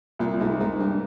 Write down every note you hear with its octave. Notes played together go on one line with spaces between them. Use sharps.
C2 A#2
C2 G#2
G#2 A#3
G2 G3